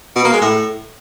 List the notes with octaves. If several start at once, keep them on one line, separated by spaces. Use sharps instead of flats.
B2
A#3
G#3
A2